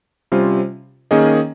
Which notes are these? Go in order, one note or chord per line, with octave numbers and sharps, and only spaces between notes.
C3 G3 C#4 F4 C5
D#3 A#3 C#4 G#4 D#5